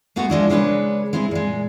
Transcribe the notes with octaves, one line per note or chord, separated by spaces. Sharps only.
G#3 A3 B3 F#4
F3 G#3 D4 E4
C#3 G#3 B3 D4 B4 C#5
G#3 C4 E4 G#4
A#2 G#3